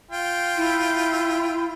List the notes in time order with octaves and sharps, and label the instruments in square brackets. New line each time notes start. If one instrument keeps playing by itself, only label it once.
[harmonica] F4 G5
[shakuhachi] E4